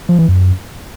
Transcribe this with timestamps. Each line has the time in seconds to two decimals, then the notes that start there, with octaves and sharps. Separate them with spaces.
0.09 F3
0.19 E3
0.28 F#2